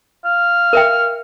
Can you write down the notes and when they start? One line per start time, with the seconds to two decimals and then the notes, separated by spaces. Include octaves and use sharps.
0.25 F5
0.73 A#4 E5 G5